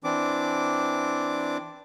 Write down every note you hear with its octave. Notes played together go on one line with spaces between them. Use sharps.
E3 C4 D4 D6